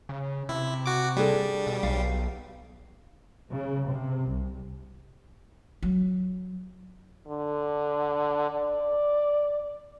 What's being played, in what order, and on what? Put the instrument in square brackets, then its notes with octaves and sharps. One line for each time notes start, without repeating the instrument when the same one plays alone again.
[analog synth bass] C#3
[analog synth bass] C3 [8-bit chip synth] E4
[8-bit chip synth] F#4 D6
[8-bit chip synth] G3 [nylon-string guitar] D4 G#4 A4
[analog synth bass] B2
[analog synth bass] B1 [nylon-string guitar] F5
[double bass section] C#3
C3
C2
[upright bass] F#3
[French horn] D3
D5